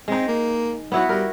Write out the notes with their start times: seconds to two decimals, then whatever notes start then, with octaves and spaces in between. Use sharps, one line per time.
0.08 G#3 C4 D#4
0.28 A#3
0.92 F#3 B3 E4 F#4
1.09 G3 A#4